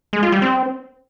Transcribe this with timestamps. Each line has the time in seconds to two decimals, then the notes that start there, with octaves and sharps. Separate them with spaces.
0.13 G#3
0.23 F4
0.32 G3
0.42 C4